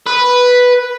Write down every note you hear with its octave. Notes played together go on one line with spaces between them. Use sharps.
B4